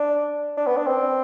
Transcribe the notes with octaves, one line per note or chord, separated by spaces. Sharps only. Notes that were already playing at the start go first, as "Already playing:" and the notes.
Already playing: D4
D4
B3
D4
C4